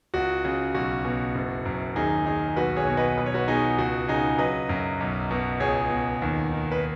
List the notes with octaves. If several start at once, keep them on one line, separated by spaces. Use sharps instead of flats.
C#2 F#4
C#3
B1 F#4
B2
F#1
F#2
D#2 D#4 G#4
D#3 D#4 G#4
B1 F#4 B4
G#4 C#5
B2
B4 D#5
B1 B4
C#5
F#4 B4
B2 D#4 G#4
C#2 F#4
C#3 D#4 G#4
F#3 B4 D#5
F#2
B1
B2
C#2 G#4 C#5
B2
D#2
D#3
B4